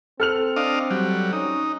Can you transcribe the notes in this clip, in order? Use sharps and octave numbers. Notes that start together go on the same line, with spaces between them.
C4 A4 F6 F7
D4 D#5 F5
F#3 G3
C#4 D#4